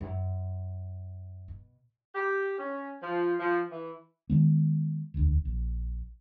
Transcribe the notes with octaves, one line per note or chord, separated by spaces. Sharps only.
F#2
B2
G4
C#4
F3
F3
E3
D#3 G#3 B3
E1 D2
A#1